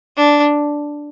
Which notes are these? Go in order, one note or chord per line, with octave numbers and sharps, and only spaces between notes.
D4